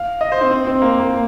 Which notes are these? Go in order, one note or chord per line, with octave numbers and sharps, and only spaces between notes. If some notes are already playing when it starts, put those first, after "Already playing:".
Already playing: F5
D#5
C5
C4
C4
C4
A#3
A#3